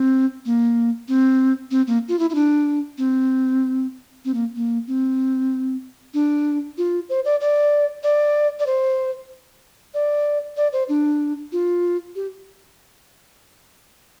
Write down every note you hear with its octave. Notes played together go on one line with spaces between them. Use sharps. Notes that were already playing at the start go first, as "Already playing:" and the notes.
Already playing: C4
A#3
C4
C4
A#3
F4
E4
E4
D4
C4
C4
A#3
A#3
C4
D4
F4
C5
D5
D5
D5
D5
C5
D5
D5
C5
D4
F4
G4